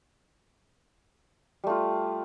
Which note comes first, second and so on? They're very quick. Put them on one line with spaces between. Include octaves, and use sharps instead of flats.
G3 A3 F4